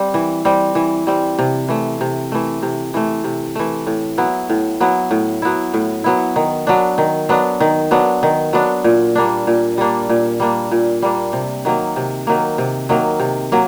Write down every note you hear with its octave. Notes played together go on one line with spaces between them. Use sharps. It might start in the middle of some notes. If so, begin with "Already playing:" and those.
Already playing: G3 C4
E3
G3 C4
E3
G3 C4
C3
E3 A3
C3
E3 A3
C3
E3 A3
C3
E3 A3
A2
F#3 B3 E4
A2
F#3 B3 E4
A2
F#3 B3 E4
A2
F#3 B3 E4
D#3
F#3 B3 D4
D#3
F#3 B3 D4
D#3
F#3 B3 D4
D#3
F#3 B3 D4
A#2
G3 A#3 D4
A#2
G3 A#3 D4
A#2
G3 A#3 D4
A#2
G3 A#3 D4
C3
D#3 F#3 A#3
C3
D#3 F#3 A#3
C3
D#3 F#3 A#3
C3
F#3 A#3